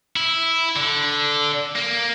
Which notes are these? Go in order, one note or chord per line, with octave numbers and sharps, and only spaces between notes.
E4
D3
A#3